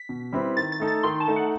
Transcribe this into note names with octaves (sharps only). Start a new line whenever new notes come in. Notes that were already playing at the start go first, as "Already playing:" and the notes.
Already playing: B6
B2
G3 C4 E4 B4
D#3 A6
A6
A3 D#4 A4
A6
D#3 C6
A5
A3 D#4 A4
F#5